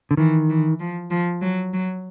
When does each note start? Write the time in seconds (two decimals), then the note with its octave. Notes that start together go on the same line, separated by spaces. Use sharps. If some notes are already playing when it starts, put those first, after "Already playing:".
0.11 D3
0.17 D#3 E3
0.50 E3
0.80 F3
1.11 F3
1.42 F#3
1.73 F#3